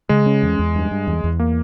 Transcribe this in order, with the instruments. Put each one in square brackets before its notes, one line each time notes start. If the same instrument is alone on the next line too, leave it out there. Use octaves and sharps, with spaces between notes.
[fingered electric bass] C#3 [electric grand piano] G#3
[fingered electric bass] C#4
E2
E2
G2
G2
E2
E2
[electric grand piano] A#3